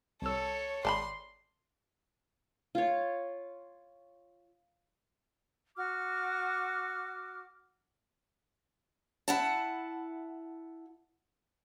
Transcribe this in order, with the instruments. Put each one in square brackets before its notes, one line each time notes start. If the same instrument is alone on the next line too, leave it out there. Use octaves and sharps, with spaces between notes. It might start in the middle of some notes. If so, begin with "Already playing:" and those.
[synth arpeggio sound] C2 E6 [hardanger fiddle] A4 C#5
[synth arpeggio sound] G#1 [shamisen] D5 A5 B5 [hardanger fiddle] C6
[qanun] F4 C#5
[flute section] F#4 D6 F6
[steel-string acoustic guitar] E4 F#5 A5